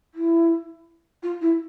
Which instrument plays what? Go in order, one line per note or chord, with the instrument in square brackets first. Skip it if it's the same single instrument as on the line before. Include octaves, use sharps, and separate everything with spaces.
[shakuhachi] E4
F4
E4